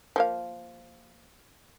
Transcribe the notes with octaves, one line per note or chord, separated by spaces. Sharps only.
F3 A#3 F5